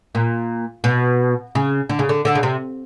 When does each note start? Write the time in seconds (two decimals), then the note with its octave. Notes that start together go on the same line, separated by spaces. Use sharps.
0.15 A#2
0.84 B2
1.55 C#3
1.89 D3
1.99 C#3
2.09 D3
2.25 D3
2.35 C#3
2.43 C3